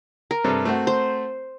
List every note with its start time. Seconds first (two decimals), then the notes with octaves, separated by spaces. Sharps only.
0.31 A#4
0.44 G2 C3 A4
0.65 A3 C4 F#4
0.87 C5